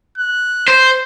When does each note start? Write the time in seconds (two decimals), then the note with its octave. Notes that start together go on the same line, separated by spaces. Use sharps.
0.18 F#6
0.68 C5 C6